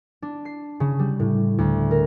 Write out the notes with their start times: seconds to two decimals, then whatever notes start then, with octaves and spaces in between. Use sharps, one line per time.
0.22 D4
0.45 C7
0.80 C#3
0.99 G3
1.20 A2
1.58 D2
1.91 A#4